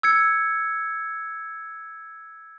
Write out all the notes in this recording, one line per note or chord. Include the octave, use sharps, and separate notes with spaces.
E6 G#6 C#7